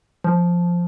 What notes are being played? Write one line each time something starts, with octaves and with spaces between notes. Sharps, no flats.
F3